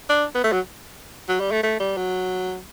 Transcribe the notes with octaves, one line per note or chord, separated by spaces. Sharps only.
D4
B3
A3
F#3
F#3
G3
A3
A3
G3
F#3